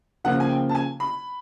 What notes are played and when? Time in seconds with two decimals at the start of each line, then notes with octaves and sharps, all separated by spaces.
0.24 C#3 F3 A#3 F#5
0.40 G#5
0.49 G5
0.69 A5
0.75 G#5
1.00 B5